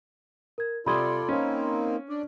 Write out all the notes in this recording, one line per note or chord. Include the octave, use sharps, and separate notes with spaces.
A#4 G#6
C3 F4 A4 D5 B5 C6 D#6 G#6
A#3 C4 C#4 D#4
D4 D5